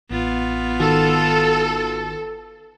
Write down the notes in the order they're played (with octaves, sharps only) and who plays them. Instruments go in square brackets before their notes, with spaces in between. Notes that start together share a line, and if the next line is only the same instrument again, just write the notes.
[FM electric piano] A1 A6 [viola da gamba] B3 F4
[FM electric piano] G#1 D#3 F#4 [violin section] A4